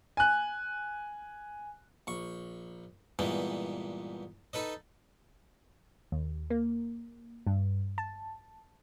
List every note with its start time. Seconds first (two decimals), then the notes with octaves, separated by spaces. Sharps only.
0.17 G#5 F#6
2.07 A#1 C#6
3.19 G2 A#2 E3 G#3 B3
4.53 D#4 A4 B4 D#5
6.12 D#2
6.50 A#3
7.47 G2
7.98 A5